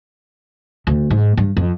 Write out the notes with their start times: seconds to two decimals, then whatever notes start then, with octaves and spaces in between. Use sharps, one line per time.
0.87 D2
1.10 G#2
1.37 G2
1.57 F2